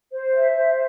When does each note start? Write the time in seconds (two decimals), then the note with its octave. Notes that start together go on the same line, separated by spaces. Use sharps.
0.12 C5
0.34 E5
0.56 C5